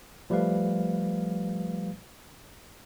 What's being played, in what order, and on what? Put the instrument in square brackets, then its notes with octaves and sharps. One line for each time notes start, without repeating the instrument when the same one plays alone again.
[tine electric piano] F3 G3 A3 B4 F5